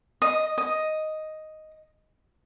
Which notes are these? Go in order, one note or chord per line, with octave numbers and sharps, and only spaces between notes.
D#5
D#5